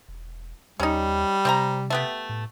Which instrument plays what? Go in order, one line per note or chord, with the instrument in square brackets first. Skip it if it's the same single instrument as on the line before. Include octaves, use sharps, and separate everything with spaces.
[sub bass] E1
[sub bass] D#2 [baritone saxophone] G3 [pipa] C#4 D#4
[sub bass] C3 [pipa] C4 C5 A#5
[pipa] A3 B3 G4
[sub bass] A2